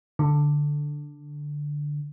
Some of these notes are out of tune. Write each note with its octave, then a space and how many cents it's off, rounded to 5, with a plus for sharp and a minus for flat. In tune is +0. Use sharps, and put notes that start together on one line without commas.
D3 +0